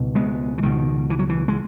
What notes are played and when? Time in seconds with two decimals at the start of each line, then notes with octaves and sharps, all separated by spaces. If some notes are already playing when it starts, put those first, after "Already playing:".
Already playing: C#2 B2
0.15 G#3 B3
0.58 E3
0.63 C#2 B2 D#3
1.10 E3
1.19 F#3
1.29 E3
1.48 G#3